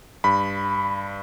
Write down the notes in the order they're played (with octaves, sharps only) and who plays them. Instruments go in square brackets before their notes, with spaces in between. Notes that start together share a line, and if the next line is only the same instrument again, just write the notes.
[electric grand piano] G2 B5